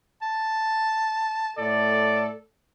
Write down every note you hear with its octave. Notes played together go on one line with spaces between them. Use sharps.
A5
A2 A4 D5